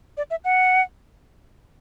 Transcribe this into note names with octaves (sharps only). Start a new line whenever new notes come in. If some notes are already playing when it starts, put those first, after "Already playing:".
D5
E5
F#5